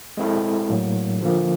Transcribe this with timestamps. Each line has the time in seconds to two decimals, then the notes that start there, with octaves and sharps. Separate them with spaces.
0.17 G#3 C4 E4 A4
0.69 A2 F#3 A#3
1.20 D3 F3 A#3